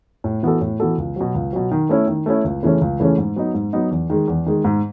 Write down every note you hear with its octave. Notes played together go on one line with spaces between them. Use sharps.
A2
E3 B3 F#4 A4
A2
E3 B3 F#4 A4
C#2
B2 F#3
C#2
B2 F#3
D#3
A3 C#4 E4
D#3
A3 C#4 E4
C#2
C#3 E3 A3 C#4
C#2
C#3 E3 A3 C#4
G#2
F#3 B3 D#4
G#2
F#3 B3 D#4
E2
D#3 G#3
E2
D#3 G#3
G#2